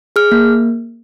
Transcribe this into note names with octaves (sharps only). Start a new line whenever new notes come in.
G#4 F6
A#3